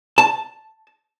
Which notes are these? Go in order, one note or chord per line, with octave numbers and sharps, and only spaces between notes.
A5